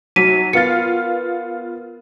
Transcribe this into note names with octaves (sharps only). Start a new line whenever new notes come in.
F#3 D#4 F#4 B6 D#7
B3 F4 A#4 F5 A6 C#7